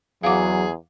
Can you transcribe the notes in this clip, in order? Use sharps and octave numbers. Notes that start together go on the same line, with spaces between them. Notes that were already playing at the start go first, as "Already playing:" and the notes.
E2 F#3 G#4 F5 F#5 D6